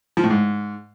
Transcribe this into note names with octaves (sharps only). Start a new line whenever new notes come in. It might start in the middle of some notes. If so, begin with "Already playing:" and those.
F3
A2
G#2